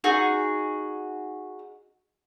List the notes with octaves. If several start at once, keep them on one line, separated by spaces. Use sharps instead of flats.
D#4 F#4 G#4